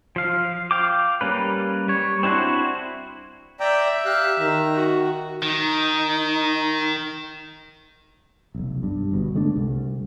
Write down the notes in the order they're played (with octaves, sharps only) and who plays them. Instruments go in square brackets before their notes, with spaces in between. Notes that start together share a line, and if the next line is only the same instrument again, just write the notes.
[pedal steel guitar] F3 F5
F5 G5 D6
G3 A#3 C#4 B4
G3 C#5
C4 D4 E4 F#4 C5
[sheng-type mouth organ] D5 G5 A#5 [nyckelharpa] E5
[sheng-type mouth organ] G4 F5 F#6
[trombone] D#3 [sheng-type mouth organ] A#5
[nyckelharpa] F#4
[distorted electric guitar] D#3 [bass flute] D#4
[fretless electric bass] F1 B1
G2
G1 B2
D3 G#3 A3 D4
C2